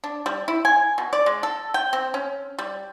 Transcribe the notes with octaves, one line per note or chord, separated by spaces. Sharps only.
D4
G3
E4
G#5
B2
D5
G#3
A4
G5
C4
C#4
G3